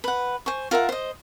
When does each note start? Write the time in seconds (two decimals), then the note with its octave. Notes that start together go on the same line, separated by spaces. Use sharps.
0.04 B4 F#5
0.46 C5 G#5 C#6
0.71 F4 A#4 E5 F#5
0.89 C5 D#5